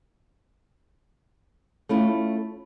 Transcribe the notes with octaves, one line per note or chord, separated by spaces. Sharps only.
A3 C#4 E4 F4